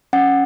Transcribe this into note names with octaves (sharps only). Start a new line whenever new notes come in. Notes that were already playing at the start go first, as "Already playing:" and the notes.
C#4 F#5